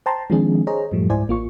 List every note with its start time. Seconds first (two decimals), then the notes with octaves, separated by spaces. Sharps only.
0.06 C5 G5 A5 A#5 C6
0.30 D#3 F3 G#3 C4 D4 G#4
0.67 G#4 C5 C#5 D#5 A#5
0.91 F#2 A2 F3 G3 A3
1.09 C#2 G#2 E4 C5 D5 G#5
1.28 A1 A#3 F4 C#6